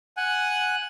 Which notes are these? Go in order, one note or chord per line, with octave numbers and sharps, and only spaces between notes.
F#5 G#5 F#6